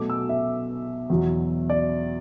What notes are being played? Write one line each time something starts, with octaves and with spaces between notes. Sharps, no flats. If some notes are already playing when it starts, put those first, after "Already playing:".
Already playing: B2 F#3 A3 D6
E6
E5
E2 B2 F#3
D5